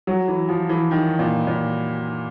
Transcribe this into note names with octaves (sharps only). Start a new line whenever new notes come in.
F#3
E3
F3
E3
D#3
A#2
A#2